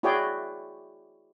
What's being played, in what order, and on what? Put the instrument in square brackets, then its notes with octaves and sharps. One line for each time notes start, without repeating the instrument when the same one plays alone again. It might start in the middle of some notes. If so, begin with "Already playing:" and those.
[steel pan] E4 F#4 G#4 C#5 D5 G5